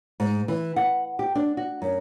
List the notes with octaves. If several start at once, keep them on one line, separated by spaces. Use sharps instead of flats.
G#2
E3
F#5
G4
D4
F#4
F#2